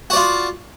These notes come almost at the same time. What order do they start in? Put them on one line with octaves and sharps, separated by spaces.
F#4 D5 F4